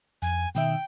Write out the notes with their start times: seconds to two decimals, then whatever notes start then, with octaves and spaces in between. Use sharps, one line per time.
0.22 F2 G#5
0.55 B2 D#3 E5 G5